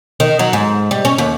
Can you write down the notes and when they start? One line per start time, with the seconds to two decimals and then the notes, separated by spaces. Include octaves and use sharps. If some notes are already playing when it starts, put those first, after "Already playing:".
0.20 D#3
0.39 F#3
0.53 G#2
0.91 G3
1.05 C#4
1.18 D#2